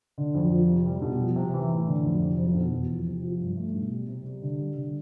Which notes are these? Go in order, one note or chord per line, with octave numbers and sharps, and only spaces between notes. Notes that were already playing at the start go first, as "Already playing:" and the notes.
D3
F2
F3
C3
G3
B2
F3
C3
E3
A2
D3
F2
C3
F2
B2
E2
F3
C3
F3
G2
A3
B2
G3
C3
G3
D3
G3
D3